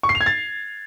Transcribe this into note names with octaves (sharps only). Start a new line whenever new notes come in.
C#6
C7
F7
G#6
A6